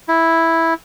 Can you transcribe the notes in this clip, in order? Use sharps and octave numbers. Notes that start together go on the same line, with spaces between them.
E4